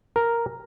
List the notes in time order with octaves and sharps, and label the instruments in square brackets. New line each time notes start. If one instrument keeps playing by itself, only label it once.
[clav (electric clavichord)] A#4